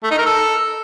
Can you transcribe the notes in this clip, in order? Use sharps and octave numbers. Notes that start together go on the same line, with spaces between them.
A3
D#4
A#4
A4